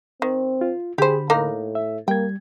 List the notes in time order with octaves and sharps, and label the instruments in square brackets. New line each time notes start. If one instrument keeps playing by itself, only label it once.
[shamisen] D#3 [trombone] C4
[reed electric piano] F4
[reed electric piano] D3 B5 [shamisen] G4 C5 [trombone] G#4
[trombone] A2 [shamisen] A#3 D#4 A#4
[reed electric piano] E5
[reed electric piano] G3 G#6 [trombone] A#3 [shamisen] G5